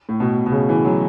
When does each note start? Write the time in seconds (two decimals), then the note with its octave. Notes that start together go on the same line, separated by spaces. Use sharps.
0.09 A2
0.20 B2
0.46 B2
0.52 C#3
0.69 E3
0.85 F#3